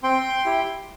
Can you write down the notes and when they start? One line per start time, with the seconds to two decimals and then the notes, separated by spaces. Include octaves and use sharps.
0.03 C4 G5 C6
0.46 E4 G4